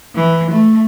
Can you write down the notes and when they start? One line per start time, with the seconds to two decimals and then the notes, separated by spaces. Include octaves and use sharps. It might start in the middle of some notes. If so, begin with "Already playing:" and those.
0.15 E3
0.50 A3